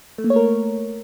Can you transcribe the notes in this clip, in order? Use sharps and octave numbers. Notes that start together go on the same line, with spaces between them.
A3
A#3
C#5
A#4